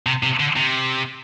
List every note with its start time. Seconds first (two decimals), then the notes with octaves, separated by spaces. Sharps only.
0.06 C3
0.23 C3
0.40 D3
0.56 C3